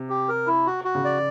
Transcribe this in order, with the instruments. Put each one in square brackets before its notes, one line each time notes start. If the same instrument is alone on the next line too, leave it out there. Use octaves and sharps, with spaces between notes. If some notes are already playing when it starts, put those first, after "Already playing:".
Already playing: [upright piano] C3
[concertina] G4
A#4
E4
F#4
F#4
[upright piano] C#3
[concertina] D5